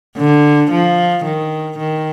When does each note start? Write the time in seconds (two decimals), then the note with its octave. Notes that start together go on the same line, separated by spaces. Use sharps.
0.17 D3
0.71 F3
1.24 D#3
1.78 D#3